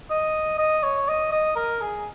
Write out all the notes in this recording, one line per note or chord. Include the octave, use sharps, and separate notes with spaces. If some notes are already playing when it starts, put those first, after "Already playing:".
D#5
D#5
C#5
D#5
D#5
A#4
G#4